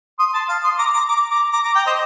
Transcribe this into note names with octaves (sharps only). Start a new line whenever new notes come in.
C6 D#6
A5 C6
F5 A5
C6 D#6
A#5 D6
A#5 D6
A#5 D6
A#5 D6
A#5 D6
A#5 D6
G5 A#5
C5 D#5